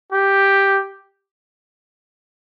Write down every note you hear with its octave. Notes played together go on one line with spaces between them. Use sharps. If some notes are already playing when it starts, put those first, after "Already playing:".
G4